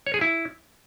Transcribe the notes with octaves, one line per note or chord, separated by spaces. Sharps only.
C#5
G#4
E4